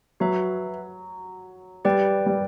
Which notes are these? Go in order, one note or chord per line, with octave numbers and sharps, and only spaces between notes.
F#3 F#4 B4 E5
G3 G4 B4 D5 G5
G3